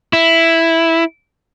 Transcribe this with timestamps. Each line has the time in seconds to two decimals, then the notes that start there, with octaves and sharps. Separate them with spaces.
0.13 E4